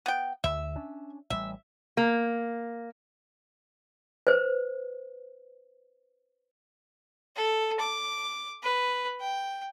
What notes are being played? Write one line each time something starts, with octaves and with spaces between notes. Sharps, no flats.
B3 G5
D2 E5
C#4 D4
A1 G3 E5
A#3
B4 C5
A4
D6
B4
G5